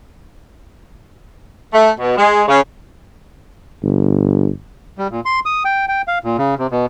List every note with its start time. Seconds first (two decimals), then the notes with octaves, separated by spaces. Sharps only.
1.73 A3
1.99 B2
2.17 G#3
2.48 C#3
3.83 G1
4.98 G3
5.11 A#2
5.25 C6
5.45 D#6
5.65 G5
5.88 G5
6.08 F5
6.24 A#2
6.38 C#3
6.59 C3
6.71 B2